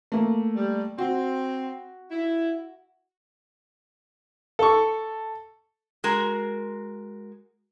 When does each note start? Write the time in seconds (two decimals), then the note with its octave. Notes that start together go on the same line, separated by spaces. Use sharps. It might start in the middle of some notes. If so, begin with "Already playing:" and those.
0.12 A3 A#3
0.56 G3
0.98 C4 F#4
2.11 E4
4.59 A4 C#6
6.04 G#3 F#4 A#4